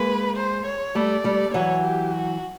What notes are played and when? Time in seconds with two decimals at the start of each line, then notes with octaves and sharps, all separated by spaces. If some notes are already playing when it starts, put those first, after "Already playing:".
Already playing: G#3 A#3 B4
0.36 C5
0.66 C#5
0.95 G3 A3 D5
1.24 G3 A3
1.54 E3 F#3 C#5
1.84 G4
2.13 F#4